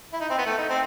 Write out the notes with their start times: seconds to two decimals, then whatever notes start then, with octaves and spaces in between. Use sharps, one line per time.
0.13 E4
0.20 D#4
0.30 C4
0.38 B3
0.46 A3
0.58 D#4
0.70 C4